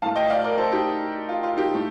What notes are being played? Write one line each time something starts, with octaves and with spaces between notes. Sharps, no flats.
A2 A3 F5 A5
D#5 G5
D5 F5
A#4 D5
A4 C5
D#4 G4
F4
F4
D#4 G4
A2 A3